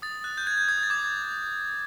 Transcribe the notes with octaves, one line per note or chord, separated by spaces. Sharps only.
D#6 A6
F#6
G6
F#6 G#6
G6
D#6 G#6
A6
D6 G#6